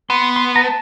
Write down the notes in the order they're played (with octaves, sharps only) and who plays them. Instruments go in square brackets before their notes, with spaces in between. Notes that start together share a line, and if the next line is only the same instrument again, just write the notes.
[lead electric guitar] B3 [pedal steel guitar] C6
[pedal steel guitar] C6
A#5
A5